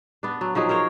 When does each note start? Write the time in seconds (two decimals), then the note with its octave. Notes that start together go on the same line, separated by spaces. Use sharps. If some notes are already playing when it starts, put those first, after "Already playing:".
0.23 B3 D4
0.41 F#3
0.55 F3 F#3 D#4 G#4
0.69 A#4 C5 C#5